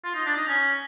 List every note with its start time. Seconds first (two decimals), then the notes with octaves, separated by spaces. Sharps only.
0.04 F4
0.15 D#4
0.26 D4
0.37 D#4
0.48 C#4